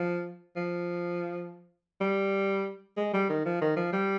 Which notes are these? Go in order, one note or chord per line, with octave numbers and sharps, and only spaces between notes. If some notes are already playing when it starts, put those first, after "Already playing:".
Already playing: F3
F3
G3
G#3
G3
D#3
F3
D#3
F3
G3